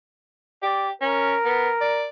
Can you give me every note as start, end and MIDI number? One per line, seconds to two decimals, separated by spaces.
0.62 0.91 67
0.62 0.87 74
1.01 1.34 61
1.01 2.08 70
1.45 1.69 59
1.81 2.06 74